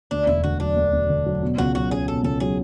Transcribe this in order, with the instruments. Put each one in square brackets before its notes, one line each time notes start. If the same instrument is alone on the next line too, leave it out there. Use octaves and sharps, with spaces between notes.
[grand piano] D2 [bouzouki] D4
[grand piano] E1 [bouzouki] E4
[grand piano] D3 [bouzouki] F#4
[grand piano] F#3 [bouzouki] D4
[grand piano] D2
E1
D3
F#3
B2
[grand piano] C#2 [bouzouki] F#4
[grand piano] F#3 [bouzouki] F#4
[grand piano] C#4 [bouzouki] G#4
[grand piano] B2 [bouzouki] A4
[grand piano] C#2 [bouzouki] A4
[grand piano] F#3 [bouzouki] G#4